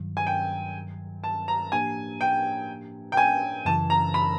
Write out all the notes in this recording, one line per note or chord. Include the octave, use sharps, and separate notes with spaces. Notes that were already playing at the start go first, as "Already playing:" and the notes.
Already playing: G2 D#3 F#3
G#5
G5
A5
A#5
A2 F3 A#3 D4 G4 G#5
G5
G5
G#5
F#2 C#3 E3 A5
A#5
B5